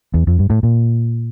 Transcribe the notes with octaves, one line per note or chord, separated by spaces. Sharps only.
E2
F2
G2
A2
A#2